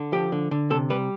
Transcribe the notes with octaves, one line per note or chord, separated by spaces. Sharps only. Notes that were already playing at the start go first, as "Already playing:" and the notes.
Already playing: D3
F3 G4
D3
D3
C3 A4
G3 B4